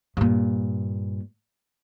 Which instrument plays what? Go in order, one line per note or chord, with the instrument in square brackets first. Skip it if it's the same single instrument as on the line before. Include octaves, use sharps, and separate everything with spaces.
[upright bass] G2 A#2